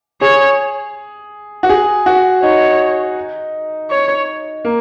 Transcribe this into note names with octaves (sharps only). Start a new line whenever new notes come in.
G#4 C#5
F#4
G#4
F#4
D#4 C#5
C#5
A#3